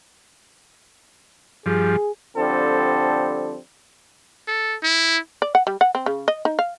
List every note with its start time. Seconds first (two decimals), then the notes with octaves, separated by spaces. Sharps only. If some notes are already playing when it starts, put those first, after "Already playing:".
1.66 G2 F3 G#4
2.37 D3 F3 G3 C4 A4
4.48 A4
4.83 E4
5.42 D5
5.55 F#5
5.67 G3
5.81 F#5
5.95 C4
6.06 C#3
6.28 D#5
6.45 D#4
6.59 F5